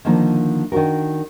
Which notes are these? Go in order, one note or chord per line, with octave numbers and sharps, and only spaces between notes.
D3 D#3 F3 A#3
D#3 D4 F#4 A#4